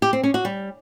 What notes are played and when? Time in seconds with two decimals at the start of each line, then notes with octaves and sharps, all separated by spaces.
0.02 G4
0.13 C4
0.23 C#4
0.34 F#4
0.45 G3